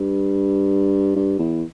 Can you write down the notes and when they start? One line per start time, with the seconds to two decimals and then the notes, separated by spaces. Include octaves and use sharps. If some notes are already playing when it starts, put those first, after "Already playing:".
Already playing: G2
1.16 G2
1.39 E2